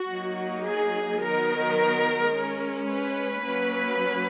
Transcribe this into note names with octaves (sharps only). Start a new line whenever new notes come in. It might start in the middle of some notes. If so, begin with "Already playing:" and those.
Already playing: F#4
F#3 A#3 D#4
G#4
D#3 F#3 B3 D#4 A#4
G#3 C#4
B4
F#3 A#3 C#4